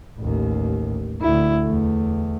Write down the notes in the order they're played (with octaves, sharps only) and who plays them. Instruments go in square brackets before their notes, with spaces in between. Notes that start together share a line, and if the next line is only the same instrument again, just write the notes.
[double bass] A1 D#2
D2 E4
E2 A3